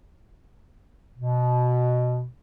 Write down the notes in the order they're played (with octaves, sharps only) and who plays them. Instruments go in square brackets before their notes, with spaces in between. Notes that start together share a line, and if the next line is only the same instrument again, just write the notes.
[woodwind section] B2